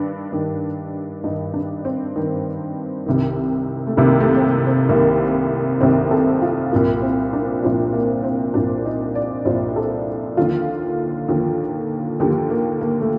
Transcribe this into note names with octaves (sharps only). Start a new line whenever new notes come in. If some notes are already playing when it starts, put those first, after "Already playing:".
Already playing: G2 D#3 D4
G2 D#3
G2 D#3 D#4
D4
C4
G2 D#3
C2 C3 D#3
A3
C2 C3 D#3 A#3
A3
C4
A#3
C4
C2 C3 D#3 A#3
C2 C3 D#3 C4
A4
F4
C2 A#2 F3 A#3
C4
D4
C2 A#2 F3 C4
A#3
C4
C2 A#2 F3 D4
D#4
D5
C2 A#2 F3 C5
A4
D#2 D3 F3 F4
D#2 D3 F3
D#2 D3 F3 G4
A#3
A#3
A3